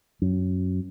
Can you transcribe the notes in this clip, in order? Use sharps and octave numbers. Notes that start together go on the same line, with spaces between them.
F#2